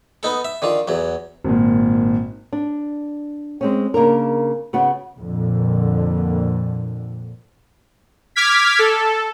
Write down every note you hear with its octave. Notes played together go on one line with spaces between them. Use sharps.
B3 D#4 A4
E5
D3 D#3 F4
E2 F#3
G#1 A#2
D4
G#3 C4 C#4
C#3 A#3 D4 A#4
C#3 B3 F#4
F2 A#2 D3
D6 F6 G#6 B6
A4